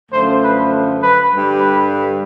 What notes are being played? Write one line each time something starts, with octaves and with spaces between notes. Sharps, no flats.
F#2 D3 F3 A3 C5
B4
B4
G2 D3 G3
B4